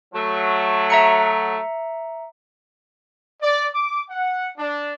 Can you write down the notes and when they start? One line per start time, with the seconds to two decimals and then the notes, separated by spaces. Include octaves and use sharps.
0.15 F#3 A3
0.90 E5 A#5 C#7
3.42 D5
3.74 D6
4.10 F#5
4.58 D4